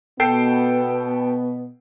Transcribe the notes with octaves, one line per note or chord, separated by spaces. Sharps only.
B2 B3 A4 G5 C7